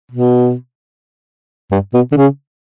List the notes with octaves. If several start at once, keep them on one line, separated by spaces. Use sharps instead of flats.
B2
G2
B2
D3
C#3